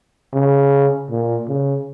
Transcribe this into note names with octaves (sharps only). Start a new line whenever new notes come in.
C#3
A#2
C#3